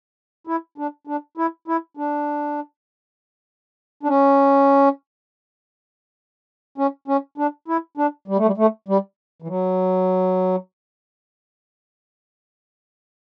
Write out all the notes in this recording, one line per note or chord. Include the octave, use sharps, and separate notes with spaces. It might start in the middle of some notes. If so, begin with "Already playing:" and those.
E4
D4
D4
E4
E4
D4
D4
C#4
C#4
C#4
D4
E4
D4
G3
A3
G3
A3
G3
E3
F#3